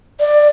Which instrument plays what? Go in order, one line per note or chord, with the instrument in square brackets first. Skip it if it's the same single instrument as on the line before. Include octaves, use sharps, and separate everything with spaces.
[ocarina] D5